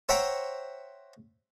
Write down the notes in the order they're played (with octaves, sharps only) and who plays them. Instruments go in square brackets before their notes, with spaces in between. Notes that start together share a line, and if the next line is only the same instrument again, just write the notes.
[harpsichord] C5 C#5 E5 F#5 G5 A#5